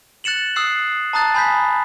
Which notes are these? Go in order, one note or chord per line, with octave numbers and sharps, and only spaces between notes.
F#6 A6 C#7 E7 F#7
D#6 E6 F#6 C7
A5 A#5 D#6 F#6 A6
G#5 B5 G6 B6